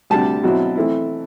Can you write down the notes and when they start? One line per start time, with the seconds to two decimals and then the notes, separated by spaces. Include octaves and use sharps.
0.10 D2 C3 G3 D4 A5
0.44 B2 F#3 C4 E4
0.75 E3 A3 C4 E4